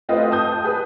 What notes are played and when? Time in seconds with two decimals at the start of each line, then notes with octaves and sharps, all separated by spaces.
0.09 A3 C4 F4 B4 D#5
0.31 A5 D#6 G6
0.64 G#4 B4